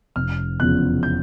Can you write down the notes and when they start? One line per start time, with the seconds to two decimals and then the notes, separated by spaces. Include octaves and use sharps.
0.16 F1 F6
0.60 E2 C#3 F3 F#6
1.03 G6